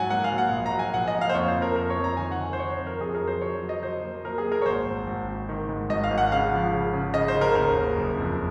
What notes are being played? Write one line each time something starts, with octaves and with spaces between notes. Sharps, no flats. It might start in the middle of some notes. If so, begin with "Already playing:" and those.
Already playing: G#2 F#3 F#5 G#5
A#3 F#5
F5
F#3
F#5
A#1
A#5
F#3
G#5
A#1 F#5
D#5
A#3
F5
C5
F2 C#5
C5
F2
A#4
F2 A#4
C#5
F2
A#5
D#3 G#5
F#5
D#3
C5
D#3 C#5
C5
F2
A#4
F2 G#4
A#4
F#3
C5
F#3 C#5
F#3
D#5
F#3 C5
A#3
F#3 A#4
G#4
A#3
A#4
C#5
G#1 C5
G#1
G#1
G#1
D#3
G#2
G#1 D#5
F5
G#1
F#5
C#3 F5
F3
C#3
C#3
C#3 D#5
C5
C#3
A#4
D#2 A#4
C#3
F#1
F2